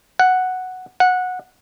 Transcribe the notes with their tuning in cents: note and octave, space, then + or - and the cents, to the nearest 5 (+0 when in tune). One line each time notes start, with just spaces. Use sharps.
F#5 +0
F#5 -15